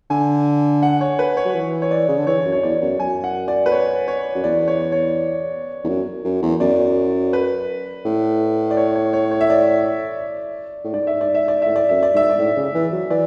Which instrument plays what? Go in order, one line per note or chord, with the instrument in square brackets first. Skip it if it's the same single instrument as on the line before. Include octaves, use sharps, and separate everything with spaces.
[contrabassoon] D3 [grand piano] G#5
[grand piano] F#5
C#5
B4
C#5
[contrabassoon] F#3
E3
[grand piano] C#5
D5
[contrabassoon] C#3
D3
[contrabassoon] E3 [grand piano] C#5
[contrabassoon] F#2
[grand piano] C#5
[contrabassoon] E2 [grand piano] D5
[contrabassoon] F#2
[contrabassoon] F#2 [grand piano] G#5
[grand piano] F#5
D5
B4
C#5
C#5
[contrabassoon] F#2
[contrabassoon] E2 [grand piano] D5
[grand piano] C#5
C#5
[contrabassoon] E2
F#2
F#2
E2
[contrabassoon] F#2 [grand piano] D5
[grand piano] B4
[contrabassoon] A2
[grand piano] D5
C#5
C#5
C#5
C#5
E5
D5
[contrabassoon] A2
[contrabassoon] G#2 [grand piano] D5
[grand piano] E5
D5
E5
D5
[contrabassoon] A2 [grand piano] E5
[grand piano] D5
[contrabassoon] F#2 [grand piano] E5
[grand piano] D5
[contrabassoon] G#2 [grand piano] E5
[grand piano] D5
[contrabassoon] A2
C#3
E3
F#3
[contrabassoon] E3 [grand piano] D5